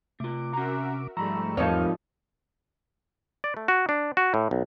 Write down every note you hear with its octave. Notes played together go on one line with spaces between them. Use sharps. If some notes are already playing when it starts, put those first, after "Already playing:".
C3 A3 F4 D6
C#4 F#4 A#4 E5 A#5
G#2 F3 G3 A3 A#5 B5 C#6 E6
E2 F3 C4 D#4 A#4 C#5 F6
D5
A3
F#4
D4
F#4
A2
B1